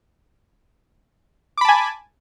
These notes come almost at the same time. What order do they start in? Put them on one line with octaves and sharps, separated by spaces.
D6 B5 A5 G#5